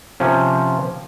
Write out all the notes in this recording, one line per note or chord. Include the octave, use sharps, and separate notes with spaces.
C3 F3 C#4